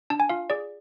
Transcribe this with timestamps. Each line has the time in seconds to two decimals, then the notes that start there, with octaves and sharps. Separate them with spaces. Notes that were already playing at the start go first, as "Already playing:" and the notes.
0.10 D4 A5
0.20 G#5
0.29 F4 F5
0.50 G#4 D5